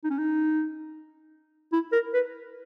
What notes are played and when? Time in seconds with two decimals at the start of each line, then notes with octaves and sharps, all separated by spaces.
0.04 D#4
0.11 C#4
0.19 D#4
1.72 E4
1.92 A#4
2.14 B4